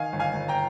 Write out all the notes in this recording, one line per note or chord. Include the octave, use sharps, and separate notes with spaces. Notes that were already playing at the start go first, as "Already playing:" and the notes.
Already playing: D#3 F5 G#5
G1
F5 G#5
G1
G5 A#5